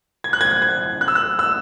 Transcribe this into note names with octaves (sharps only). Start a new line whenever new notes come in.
G#6
F#6
G#6
G#6
F#6
E6
F#6
E6